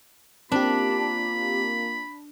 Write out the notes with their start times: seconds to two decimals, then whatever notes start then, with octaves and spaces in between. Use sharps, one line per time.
0.52 A#3 C4 D4 F4 G4 B5